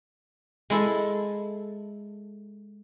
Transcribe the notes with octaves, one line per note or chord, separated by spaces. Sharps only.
G#3 E4 A4